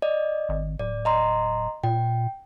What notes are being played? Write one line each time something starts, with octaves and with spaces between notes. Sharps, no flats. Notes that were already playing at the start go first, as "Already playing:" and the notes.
D5 D#5
G#1
D1 D5
D#5 A#5 C6
A#2 G5